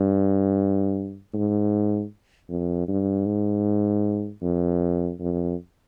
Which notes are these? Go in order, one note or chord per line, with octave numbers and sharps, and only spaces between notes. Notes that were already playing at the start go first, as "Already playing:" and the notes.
Already playing: G2
G#2
F2
G2
G#2
F2
F2